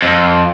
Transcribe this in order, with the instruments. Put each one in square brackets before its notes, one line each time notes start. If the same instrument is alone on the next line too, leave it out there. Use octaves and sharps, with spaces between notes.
[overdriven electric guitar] F2